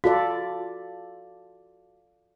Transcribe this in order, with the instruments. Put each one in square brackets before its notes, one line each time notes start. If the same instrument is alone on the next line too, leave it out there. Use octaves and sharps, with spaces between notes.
[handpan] F4 A4 D5 [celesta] F#4